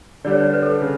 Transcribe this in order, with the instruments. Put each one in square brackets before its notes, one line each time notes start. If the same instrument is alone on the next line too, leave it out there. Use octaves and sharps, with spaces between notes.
[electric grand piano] D3 G3 D4 G4 [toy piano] D5
[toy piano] C#5
B4
B4
A4
[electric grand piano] C#3